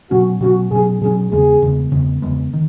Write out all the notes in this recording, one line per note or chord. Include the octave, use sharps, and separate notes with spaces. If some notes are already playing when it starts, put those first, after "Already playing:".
B2 F#3 C#4 F#4
B2 F#3 C#4 F#4
B2 F#3 C#4 G#4
B2 F#3 C#4 G#4
E2 C#3 G#3 B3 G#4
E2 C#3 G#3 B3
E2 C#3 G#3 B3
E2 C#3 G#3 B3
D#3